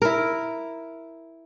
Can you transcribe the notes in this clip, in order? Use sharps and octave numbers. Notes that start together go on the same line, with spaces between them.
E4 A#4